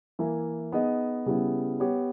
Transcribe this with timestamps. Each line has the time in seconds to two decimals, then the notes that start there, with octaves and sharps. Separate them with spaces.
0.19 E3 A#3 E4 A#4
0.72 B3 D#4 G#4 D#5
1.26 C#3 G3 B3 E4
1.80 B3 G4 C#5